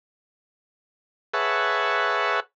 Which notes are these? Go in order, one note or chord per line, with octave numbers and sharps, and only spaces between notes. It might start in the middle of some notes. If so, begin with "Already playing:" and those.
G#4 B4 C#5 E5 F#5 A5